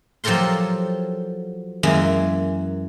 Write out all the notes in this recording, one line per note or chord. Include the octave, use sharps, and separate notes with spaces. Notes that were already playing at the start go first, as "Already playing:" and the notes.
F3 F#3 G4 A4 A#4 C6
F#2 E3 G#3 A#3